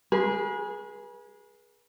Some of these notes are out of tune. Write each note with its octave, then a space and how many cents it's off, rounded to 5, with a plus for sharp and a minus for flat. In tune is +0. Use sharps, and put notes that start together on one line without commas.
G#4 +0 B4 -40